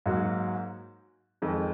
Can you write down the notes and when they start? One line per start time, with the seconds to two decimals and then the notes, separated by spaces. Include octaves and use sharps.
0.06 G#2 F#3 A#3 D#4 F#4
1.42 F2 D#3 G#3